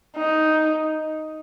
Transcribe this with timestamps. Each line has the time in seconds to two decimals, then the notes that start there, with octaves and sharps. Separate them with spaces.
0.16 D#4